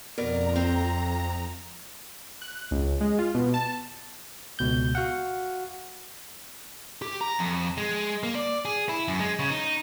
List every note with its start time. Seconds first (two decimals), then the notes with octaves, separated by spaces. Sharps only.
0.18 F2 B2 A#4 D5 A#5
0.56 C4
2.42 F#6
2.71 C#2
3.01 G#3
3.19 F4
3.35 B2
3.54 A5
4.59 C#2 B2 G6
4.95 F#4 F5 F#5
7.02 G4
7.21 A#5
7.39 F2
7.78 G#3
8.23 A#3
8.35 D5
8.65 G#4
8.89 E4
9.08 F#2
9.20 G#3
9.39 C#3
9.50 D#4